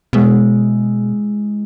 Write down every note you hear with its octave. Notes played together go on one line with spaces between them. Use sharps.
B2 G#3 E4